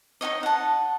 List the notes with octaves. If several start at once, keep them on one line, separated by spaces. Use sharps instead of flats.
D#4 F#4 C#5 D#5
F#5 A5